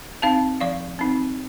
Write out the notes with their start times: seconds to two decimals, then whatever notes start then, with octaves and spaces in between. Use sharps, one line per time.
0.22 C4 D#4 F5 A5
0.61 F3 D5 F5
0.99 C4 D#4